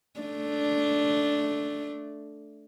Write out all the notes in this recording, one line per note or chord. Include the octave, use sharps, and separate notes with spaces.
A3 D4